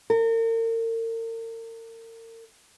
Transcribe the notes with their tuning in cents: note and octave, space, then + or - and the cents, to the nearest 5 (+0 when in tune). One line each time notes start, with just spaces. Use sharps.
A#4 -40